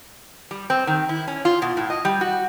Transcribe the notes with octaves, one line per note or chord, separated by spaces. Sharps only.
G3
C4
D#3
E4
C#4
F4
B2
A2
D#5
G3
F#4